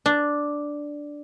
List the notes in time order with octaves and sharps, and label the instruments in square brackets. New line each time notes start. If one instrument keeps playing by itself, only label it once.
[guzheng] D4